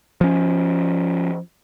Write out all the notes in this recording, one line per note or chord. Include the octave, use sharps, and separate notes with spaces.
F3 C#4